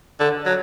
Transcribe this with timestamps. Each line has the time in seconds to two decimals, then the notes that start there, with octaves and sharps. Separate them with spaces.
0.20 D3
0.46 F#3